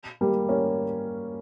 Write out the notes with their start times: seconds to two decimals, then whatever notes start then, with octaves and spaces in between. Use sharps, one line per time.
0.21 G3 A#3
0.49 A#3 C#4